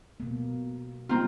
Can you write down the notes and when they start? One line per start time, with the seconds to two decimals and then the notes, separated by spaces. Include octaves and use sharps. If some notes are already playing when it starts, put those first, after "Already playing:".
0.20 B2 A#3
1.09 G3 A#3 C4 D#4 F4